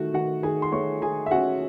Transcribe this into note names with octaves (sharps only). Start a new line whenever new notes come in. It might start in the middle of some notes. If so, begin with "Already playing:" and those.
Already playing: D#3 A3 F#4
D#3 F#4 F#5
D#3 G#4 G#5
C6
A3 C#5 C#6
D#3 G#4 G#5
E5
C#4 F#4 F#5